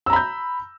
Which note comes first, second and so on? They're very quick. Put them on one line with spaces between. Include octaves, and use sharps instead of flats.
E6 A#5 B5 G6